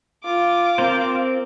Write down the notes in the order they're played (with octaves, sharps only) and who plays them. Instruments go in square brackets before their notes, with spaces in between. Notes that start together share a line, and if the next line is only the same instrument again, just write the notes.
[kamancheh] F4 D6
[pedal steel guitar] C4 A#4 C5